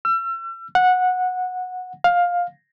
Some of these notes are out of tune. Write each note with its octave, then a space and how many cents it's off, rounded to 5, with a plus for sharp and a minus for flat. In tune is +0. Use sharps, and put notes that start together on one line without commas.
E6 +40
F#5 -15
F5 +15